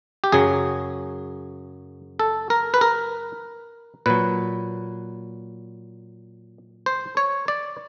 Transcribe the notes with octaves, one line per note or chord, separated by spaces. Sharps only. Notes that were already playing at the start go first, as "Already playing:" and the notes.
G4
F#2 C#3 F#3 G#4
A4
A#4
B4
A#4
A#2 F#3 B4
C5
C#5
D5